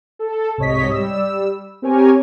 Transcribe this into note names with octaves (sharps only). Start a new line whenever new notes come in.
A4
C2 G#2 C#5 D#5 B6
G3 E6
C4 G4 A#4 C#5 G#5